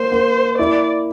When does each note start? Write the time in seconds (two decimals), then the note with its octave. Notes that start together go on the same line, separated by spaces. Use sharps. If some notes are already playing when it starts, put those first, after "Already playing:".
Already playing: A#3 C5
0.12 A#3
0.58 E4 D5